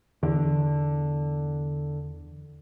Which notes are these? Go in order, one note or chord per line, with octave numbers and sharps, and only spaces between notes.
E2 D3